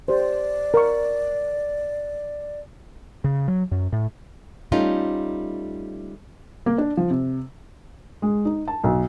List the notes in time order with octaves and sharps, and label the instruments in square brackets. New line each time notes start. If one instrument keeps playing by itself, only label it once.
[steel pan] G4 C5 [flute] D5
[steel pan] A#4 C#6
[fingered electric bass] C#3
F#3
F#2
A2
[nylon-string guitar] G3 A3 C#4 D#4 F4
[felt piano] A#3
D4
F3
C3
G#3
D#4
A5
B1